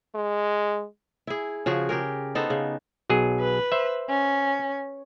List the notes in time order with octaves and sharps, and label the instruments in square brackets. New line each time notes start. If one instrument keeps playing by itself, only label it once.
[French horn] G#3
[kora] E4 G#4
C#3 F3 F#4 G#4
G4 G#4 A#4
B3 D#4 A4 C5
C#3
[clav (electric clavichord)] B1 F#3 G#4
[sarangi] B4
[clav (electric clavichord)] C5 E5
[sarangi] C#4